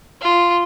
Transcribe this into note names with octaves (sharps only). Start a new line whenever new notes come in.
F4